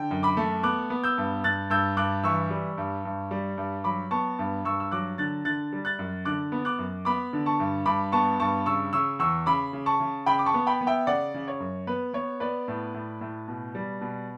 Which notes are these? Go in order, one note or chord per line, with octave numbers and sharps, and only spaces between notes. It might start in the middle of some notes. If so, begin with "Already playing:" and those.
Already playing: D3 G5
F#2
B5 D6
A3
B3 D6 F#6
B3
E6 G6
G2
G2 F#6 A6
G2 E6 G6
G2 D6 F#6
E3 C#6 E6
G3
G2
G2
G3
G2
F#3 B5 D6
B3 A5 C#6
G2
G2 C#6 E6
E6
F#3 D6 F#6
D3 F#6 A6
D3 F#6 A6
G3
F#6 A6
F#2
D3 D6 F#6
B3
D6 F#6
F#2
B3 B5 D6
D3
A5 C#6
G2
G2 B5 D6
B3 A5 C#6
G2 A5 C#6
C#3 C#6 E6
C#3 C#6 E6
E2 C#6 E6
C#3 B5 D6
C#3
A5 C#6
C#3
C#3 G5 B5
D6
A5 C#6
B3
G5 B5
B3
E5 G5
C#3 D5 F#5
C#3
C#5
F#2
B3 B4
B3 C#5
B3 B4 D5
A2
A2
A2
B2
G3
B2